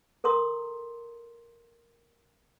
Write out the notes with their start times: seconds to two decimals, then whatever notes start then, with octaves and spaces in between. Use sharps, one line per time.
0.24 A4 A#4 A#5 C6 D#6